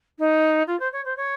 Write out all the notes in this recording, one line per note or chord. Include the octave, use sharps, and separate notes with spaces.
D#4
F4
C5
C#5
C5
C#5